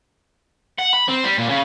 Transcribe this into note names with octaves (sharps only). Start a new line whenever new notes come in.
F#5
B5
C4
G3
A#2
C#3